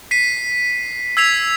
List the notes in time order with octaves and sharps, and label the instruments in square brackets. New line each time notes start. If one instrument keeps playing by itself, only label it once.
[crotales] B6 C7 D#7
E6 G#6 B6 C7 F7